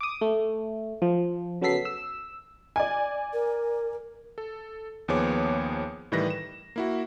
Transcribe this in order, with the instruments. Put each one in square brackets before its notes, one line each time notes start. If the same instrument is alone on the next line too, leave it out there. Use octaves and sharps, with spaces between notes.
[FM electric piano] D6 D#6
A3
F3
C#3 F#3 B3 A4 B6 C7
E6
[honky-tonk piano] D5 G#5
[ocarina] A#4
[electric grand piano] A4
D#2 F3 B3 G#4 C#5 D6
A2 D#3 E3 G3 B4 A#6
E7
A#3 E4 F#4